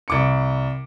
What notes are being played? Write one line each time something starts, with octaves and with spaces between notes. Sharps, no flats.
C2 D6 C#7